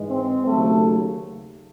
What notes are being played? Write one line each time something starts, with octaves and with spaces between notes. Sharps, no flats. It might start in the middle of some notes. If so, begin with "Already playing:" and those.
Already playing: G#2 E3 G#3
C4
D#2 C#3 F#3 A3